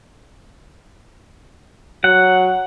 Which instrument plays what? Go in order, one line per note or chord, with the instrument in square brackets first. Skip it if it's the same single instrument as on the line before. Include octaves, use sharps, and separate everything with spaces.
[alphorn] F#3 [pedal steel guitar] F#5